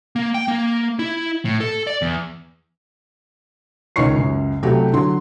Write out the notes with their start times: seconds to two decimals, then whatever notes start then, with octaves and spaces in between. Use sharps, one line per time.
0.16 A#3
0.34 G5
0.48 A#3
0.99 E4
1.45 A2
1.61 A4
1.87 D5
2.02 E2
3.96 C#2 D#3 C#5 C#6 C7
4.16 C#2 F#2
4.63 C2 F#3 A3 G4
4.93 D3 F#3 C6